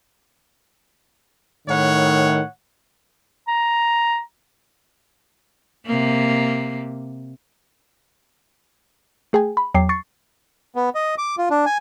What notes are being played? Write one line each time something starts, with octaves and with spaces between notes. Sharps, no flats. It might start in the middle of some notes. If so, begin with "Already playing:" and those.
A2 D#3 C#5 F#5
A#5
C3 A#3
A3 G#4 G5 G#5
B5
E2 F#3 G5 D6 C7
C#6 A6 C7 C#7
B3
D#5
D6
F4
D4
G#5